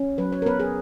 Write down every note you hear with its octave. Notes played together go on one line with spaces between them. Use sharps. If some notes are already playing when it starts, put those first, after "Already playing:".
Already playing: C#4
F#3 B4
C#5
A#4
B3 B4
G#4